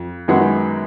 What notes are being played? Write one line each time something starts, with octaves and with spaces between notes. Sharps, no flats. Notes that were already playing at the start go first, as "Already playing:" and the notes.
Already playing: F2
F#2 D#3 G#3 B3 F#4